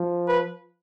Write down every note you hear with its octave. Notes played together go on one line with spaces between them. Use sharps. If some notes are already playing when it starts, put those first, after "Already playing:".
Already playing: F3
B4